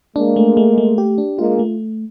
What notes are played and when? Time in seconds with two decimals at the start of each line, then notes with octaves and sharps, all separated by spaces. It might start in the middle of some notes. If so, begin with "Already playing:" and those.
0.16 G#3 A#3 D4
0.36 A3
0.57 A3
0.78 A3
0.98 G4
1.18 D4
1.38 G#3 A#3 F4
1.59 A3